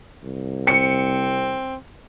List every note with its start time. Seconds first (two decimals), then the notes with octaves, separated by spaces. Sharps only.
0.24 C2
0.67 C4 C#7